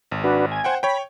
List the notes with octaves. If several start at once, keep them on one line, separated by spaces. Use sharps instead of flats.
G#1
D4 F#4 B4
G#5
C5 F#5 G5
C#5 G5 B5